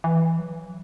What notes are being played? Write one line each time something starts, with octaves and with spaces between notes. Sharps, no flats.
E3
F#3